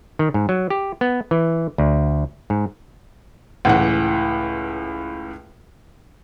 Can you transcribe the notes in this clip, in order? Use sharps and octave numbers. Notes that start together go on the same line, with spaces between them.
D#3
G#2
F#3
G4
B3
E3
D2
G#2
C#2 A2 E3 F#5